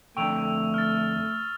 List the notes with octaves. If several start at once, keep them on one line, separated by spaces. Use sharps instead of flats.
F2 D3 A3 G5 C#6 E6 F7
F6 A6